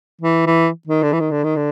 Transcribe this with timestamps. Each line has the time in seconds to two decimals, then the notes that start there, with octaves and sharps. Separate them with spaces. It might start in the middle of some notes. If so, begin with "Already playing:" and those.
0.21 E3
0.46 E3
0.87 D#3
1.03 D3
1.13 E3
1.20 D#3
1.31 D3
1.44 D#3
1.56 D3